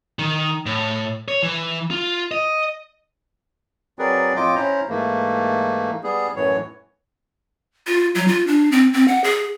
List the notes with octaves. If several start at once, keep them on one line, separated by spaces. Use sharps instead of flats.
D#3
A2
C#5
E3
F4
D#5
F#3 C4 G#4 A#4 B4 D5
F2 A2 F4 D#5 G5 D6
C#4 E4 C5 A#5
G#2 E3 A3 A#3
G3 B3 G#4
F#2 A2 E3 C#5
F4
F#3
F4
D4
C4
C4
F#5
G#4